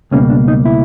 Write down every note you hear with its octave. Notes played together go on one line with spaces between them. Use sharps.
C#2 B2 G3 A#3 C#4
D4
D#4
E4